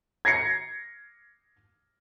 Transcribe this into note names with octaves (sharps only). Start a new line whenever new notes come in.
G#6 A#6 C7 C#7